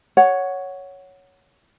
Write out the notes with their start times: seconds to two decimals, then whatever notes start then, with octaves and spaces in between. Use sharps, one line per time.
0.17 C#5 F#5